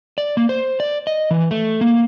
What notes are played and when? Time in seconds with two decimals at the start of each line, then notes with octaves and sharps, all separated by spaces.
0.18 D5
0.37 A#3
0.49 C5
0.80 D5
1.07 D#5
1.31 E3
1.51 A3
1.81 A#3